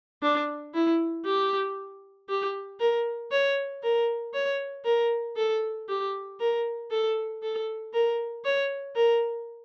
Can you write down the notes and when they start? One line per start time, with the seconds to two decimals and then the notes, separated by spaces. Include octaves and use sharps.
0.22 D4
0.74 E4
1.25 G4
2.29 G4
2.79 A#4
3.32 C#5
3.83 A#4
4.34 C#5
4.85 A#4
5.37 A4
5.89 G4
6.40 A#4
6.91 A4
7.43 A4
7.94 A#4
8.44 C#5
8.96 A#4